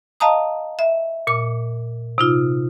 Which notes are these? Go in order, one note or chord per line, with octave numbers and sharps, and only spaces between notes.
D#5 F5 A5 A#5 D#6
E5
A#2 D6
C3 D#4 F4